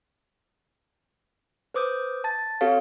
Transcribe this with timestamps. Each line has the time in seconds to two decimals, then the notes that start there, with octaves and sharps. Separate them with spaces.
1.74 B4 C5 D6 D#6 G6
2.24 A5 A6
2.61 C4 F#4 G4 A4 C#5 F5